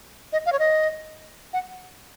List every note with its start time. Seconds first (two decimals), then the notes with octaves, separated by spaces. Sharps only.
0.33 D#5
0.46 F5
0.53 C#5
0.59 D#5
1.53 F#5